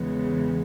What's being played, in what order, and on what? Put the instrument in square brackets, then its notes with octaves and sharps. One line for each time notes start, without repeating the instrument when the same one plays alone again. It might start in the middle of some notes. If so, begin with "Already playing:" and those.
Already playing: [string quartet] E2 C#3 G#3 B3